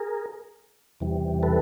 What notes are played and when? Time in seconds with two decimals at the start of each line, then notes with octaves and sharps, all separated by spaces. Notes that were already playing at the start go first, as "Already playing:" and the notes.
Already playing: G#4 A#4
1.00 E2 C3 E3 G3
1.43 A4 B4